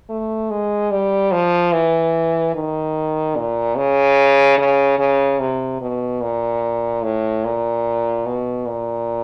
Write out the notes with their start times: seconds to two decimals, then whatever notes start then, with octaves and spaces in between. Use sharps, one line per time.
0.09 A3
0.50 G#3
0.91 G3
1.32 F3
1.72 E3
2.54 D#3
3.36 A#2
3.77 C#3
4.58 C#3
4.99 C#3
5.39 C3
5.81 B2
6.22 A#2
7.03 A2
7.44 A#2
8.25 B2
8.66 A#2